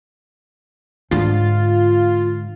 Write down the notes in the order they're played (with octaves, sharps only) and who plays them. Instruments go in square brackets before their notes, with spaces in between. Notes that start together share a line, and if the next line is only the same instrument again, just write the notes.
[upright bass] G#2 D3 [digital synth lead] F4